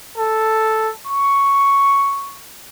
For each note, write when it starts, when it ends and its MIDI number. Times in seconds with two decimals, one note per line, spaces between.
0.18 0.91 69
1.08 2.40 85